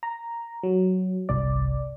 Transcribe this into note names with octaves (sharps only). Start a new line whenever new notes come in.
A#5
F#3
G1 C2 D5